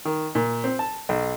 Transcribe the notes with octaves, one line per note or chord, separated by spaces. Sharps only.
D#3
A#2
C4
A5
B1